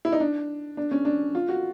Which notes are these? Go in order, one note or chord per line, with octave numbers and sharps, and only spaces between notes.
E4
D#4
D4
D4
C#4
D4
F4
F#4